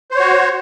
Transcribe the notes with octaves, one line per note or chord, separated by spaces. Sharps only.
F#4 C5 C#5